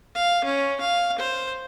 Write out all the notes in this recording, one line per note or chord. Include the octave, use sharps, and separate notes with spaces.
F5
C#4
F5
C5